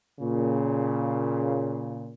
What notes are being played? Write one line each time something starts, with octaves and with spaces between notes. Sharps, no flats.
A#2 C#3